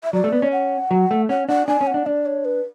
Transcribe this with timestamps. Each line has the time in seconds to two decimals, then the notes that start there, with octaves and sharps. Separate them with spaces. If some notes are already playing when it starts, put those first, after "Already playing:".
0.04 E5
0.13 F#3 D5
0.24 A3
0.32 B3
0.42 C#4
0.52 F#5
0.91 F#3
1.11 A3
1.29 C#4 F#5
1.48 D4 F#5
1.67 D4 G#5
1.81 C#4
1.87 F#5
1.94 D4
2.06 D4 D5
2.26 C#5
2.45 B4